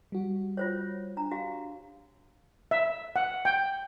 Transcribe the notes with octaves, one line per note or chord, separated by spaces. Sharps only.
G3 F#4
F4 C5 C#5
D4 A#5
F#4 G4 F5
E5
F#5
G5